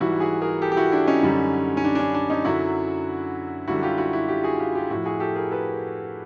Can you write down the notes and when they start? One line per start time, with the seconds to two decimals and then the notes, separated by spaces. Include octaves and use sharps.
0.01 G#2 E3 G3 E4 F#4
0.20 F#4 G#4
0.41 G#4 A#4
0.62 G4 A4
0.72 G4
0.77 E4 F#4
0.92 D4 E4
1.07 C#4 D#4
1.23 F#2 D3 G3
1.77 C#4
1.85 D4
1.95 D4
1.99 C#4
2.14 D4
2.30 C#4 D#4
2.45 F#2 D3 F#3 E4 F#4
3.68 F#2 D3 G3 E4 F#4
3.83 F4 G4
3.98 E4 F#4
4.13 E4 F#4
4.28 F4 G4
4.44 F#4 G#4
4.59 F4 G4
4.75 F4 G4
4.90 A2 F3 E4 F#4
5.06 F#4 G#4
5.20 G4 A4
5.35 G#4 A#4
5.51 A4 B4